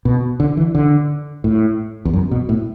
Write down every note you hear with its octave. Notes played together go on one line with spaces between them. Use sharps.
B2
D3
E3
D3
A2
E2
F#2
B2
A2